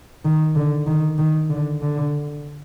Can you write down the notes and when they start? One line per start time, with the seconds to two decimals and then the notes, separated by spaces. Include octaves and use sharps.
0.25 D#3
0.56 D3
0.87 D#3
1.18 D#3
1.49 D3
1.82 D3